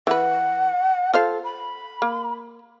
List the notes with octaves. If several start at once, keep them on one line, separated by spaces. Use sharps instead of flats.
E3 B4 F#5
F4 A4 C5 F5
B5
A#3